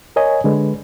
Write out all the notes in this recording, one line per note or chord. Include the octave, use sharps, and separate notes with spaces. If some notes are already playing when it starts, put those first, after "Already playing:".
A#4 C#5 D#5 G#5
D3 G#3 B4